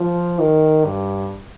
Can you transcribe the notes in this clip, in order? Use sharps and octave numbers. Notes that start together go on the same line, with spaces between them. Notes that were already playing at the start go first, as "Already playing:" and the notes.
Already playing: F3
D#3
G2